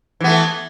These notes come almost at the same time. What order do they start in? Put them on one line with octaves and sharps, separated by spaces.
E3 B3 A3